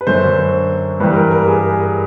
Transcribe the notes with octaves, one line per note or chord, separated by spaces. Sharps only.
B4
F#2 D3 F#3 C5
G2 E3 G3 B4
A#4
A#4
G#4